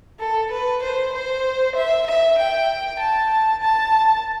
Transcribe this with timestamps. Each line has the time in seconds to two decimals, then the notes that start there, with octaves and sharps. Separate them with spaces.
0.19 A4
0.51 B4
0.83 C5
1.13 C5
1.76 E5
2.07 E5
2.38 G5
3.00 A5
3.63 A5